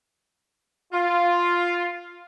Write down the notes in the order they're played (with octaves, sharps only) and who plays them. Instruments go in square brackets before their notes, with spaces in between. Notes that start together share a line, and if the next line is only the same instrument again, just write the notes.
[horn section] F4